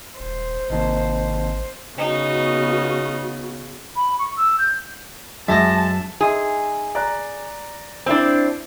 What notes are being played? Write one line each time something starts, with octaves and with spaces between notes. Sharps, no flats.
D#1 C5
G#1 C3 D#3 A#3 D#5 A5
C#3 B3 D#4 F#4
B5
C#6
E6
G6
F#2 G#3 D#5 E5 A5
D#4 G#4 E5 C6
D5 A#5 F#6
C4 D4 E4 C5